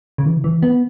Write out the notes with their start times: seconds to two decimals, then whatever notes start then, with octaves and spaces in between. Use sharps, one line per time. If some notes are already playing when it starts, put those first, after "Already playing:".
0.18 C#3
0.26 E3
0.37 C#3
0.44 E3
0.62 B3